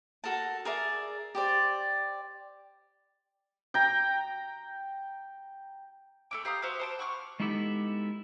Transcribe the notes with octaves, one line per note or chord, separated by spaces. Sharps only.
F#4 A4 A#4 A5
G#4 A#4 D5 E5
G4 C5 D5
G5 A#5
A3 C#4 D6
G4 F5 A#5 D#6
F#4 C5 E5 F5
C5 A5 D6
F#5 C#6 D6 F6
G#3 B3 D#4 E4 G4 A4